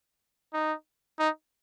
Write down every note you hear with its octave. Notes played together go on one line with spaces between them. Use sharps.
D#4
D#4